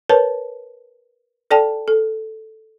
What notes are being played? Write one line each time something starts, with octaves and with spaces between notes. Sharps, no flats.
A#4 B4 C#5 A5
A4 D5 G5 A5
A4